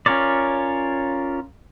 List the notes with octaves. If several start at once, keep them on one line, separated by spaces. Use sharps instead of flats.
C#4 F4 A#4 C#5 D5